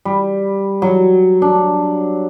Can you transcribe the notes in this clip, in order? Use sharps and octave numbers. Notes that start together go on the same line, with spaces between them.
G3
F#3
D4